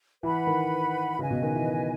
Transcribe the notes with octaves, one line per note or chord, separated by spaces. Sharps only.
E3 B4 F#5 B5
D#3
C#3 B4 D#5 G#5
B2
D#3
E3